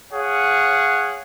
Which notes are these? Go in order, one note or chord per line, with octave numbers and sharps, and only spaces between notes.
G#4 C#5 F5 F#5